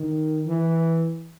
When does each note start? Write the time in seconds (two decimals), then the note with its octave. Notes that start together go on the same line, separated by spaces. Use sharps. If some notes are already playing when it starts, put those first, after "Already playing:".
Already playing: D#3
0.46 E3